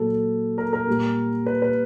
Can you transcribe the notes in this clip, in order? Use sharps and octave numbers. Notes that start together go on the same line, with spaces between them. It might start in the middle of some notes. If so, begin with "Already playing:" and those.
Already playing: A#2 F#3 A4
A#4
A#4
A#2 G3
B4
B4